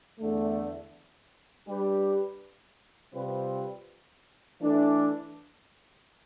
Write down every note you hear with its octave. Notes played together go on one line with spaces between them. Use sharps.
E2 D3 A3
G3 D4 G4 B4
C3 G3 C4 F4 B4
E3 A3 D4 A4